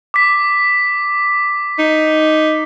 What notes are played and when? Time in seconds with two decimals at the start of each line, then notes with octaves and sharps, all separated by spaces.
0.14 D6 B6
1.79 D#4